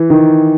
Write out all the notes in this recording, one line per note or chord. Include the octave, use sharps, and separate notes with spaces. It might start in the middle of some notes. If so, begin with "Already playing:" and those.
Already playing: E3
D#3